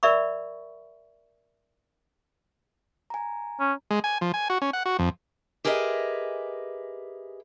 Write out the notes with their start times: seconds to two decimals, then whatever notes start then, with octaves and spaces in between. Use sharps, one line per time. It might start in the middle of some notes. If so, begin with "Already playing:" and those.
0.03 A#4 D5 E5 B5 C#6
3.10 G#5 A#5
3.60 C#4
3.91 G#3
4.04 G#5
4.21 F3
4.34 G#5
4.50 F#4
4.62 C#4
4.73 F#5
4.86 F#4
4.99 F2
5.65 G4 G#4 A#4 B4 D#5 E5